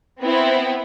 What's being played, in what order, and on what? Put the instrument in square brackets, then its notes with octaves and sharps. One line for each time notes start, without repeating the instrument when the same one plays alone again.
[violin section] B3 C4 E4